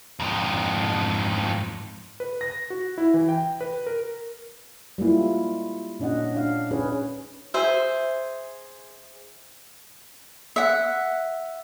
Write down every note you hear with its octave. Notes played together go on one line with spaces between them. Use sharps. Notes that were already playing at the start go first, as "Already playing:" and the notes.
F2 G#2
B4
A#6
F#4
E4
E3
G5
B4
A#4
G3 G#3 A#3 E4 F4
A#2 C#4 D4 D#5 F#5
D4 F5
C#4 D#4 G#4 B4 C#5
G#4 C5 E5
E5 F#5